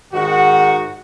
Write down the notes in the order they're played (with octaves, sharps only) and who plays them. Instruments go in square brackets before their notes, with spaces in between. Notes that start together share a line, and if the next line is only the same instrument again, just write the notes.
[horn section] G#2 D#3 F#4